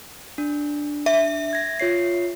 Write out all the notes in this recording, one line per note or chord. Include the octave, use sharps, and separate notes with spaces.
D4
E5
G#6 A#6
F4 C#5 C7